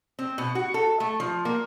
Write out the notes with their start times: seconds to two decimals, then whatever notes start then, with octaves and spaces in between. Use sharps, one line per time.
0.19 C4
0.38 B2
0.55 F#4
0.74 A4
1.00 A3
1.20 F3
1.45 A#3